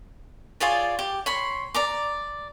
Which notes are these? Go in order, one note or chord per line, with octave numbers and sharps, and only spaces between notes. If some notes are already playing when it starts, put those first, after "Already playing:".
F4 G#4 C#5 D5
G4
C#5 B5 C6
D5 A#5 D6